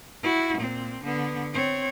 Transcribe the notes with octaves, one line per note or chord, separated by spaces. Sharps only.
E4 F#4
A#2 C4
D3 B3
C4 C#5